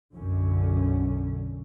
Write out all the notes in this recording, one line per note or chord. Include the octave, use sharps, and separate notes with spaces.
B1 F#2 D3 C#4